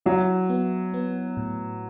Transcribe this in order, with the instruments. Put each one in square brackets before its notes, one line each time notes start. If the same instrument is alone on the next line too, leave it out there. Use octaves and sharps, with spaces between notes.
[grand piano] F#3 [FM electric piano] E4
[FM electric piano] B3
B3
A2